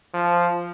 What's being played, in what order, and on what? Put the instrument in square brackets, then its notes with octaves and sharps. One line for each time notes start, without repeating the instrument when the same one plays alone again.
[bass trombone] F3